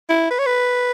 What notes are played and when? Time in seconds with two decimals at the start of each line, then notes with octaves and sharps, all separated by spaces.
0.09 E4
0.31 B4
0.39 C#5
0.46 B4